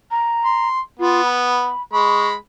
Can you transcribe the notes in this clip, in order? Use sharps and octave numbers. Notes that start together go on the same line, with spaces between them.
A#5
C6
B3 F4
B5
G#3 B5 C#6